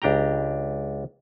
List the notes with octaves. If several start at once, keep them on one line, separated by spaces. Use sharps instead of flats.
C#2 D4 G4 G5 A#5